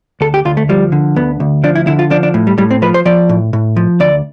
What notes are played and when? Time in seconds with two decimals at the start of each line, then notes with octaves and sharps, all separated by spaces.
0.21 D2 A4
0.34 G4
0.45 D2 F4
0.57 A3
0.69 F3 G3
0.92 D3
1.16 D2 B3
1.40 D2
1.64 F3 D4
1.75 E4
1.87 D3 E4
1.99 F4
2.10 F3 D4
2.23 D4
2.34 A2
2.47 G3
2.58 A2 G3
2.71 C4
2.82 F3 B4
2.94 C5
3.05 F3 D5
3.29 A2
3.53 A2
3.76 F3
4.00 D2 D5